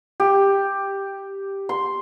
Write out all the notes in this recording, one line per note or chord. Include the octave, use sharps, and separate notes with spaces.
G4
C6